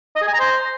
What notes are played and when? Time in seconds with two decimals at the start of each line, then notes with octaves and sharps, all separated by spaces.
0.16 D#5
0.22 G#4
0.28 G#5
0.33 A#5
0.39 C5